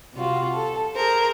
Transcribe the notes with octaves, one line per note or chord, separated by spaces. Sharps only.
C3 G3 F4 F#4
A4
G#4 A#4 C5